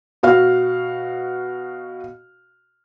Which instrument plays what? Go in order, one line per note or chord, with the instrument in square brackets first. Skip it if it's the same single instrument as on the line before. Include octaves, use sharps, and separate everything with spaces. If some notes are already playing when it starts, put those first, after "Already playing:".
[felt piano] B2 F#4 F5 F6